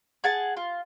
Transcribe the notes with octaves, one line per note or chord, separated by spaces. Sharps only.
G#4 F#5 A5
F4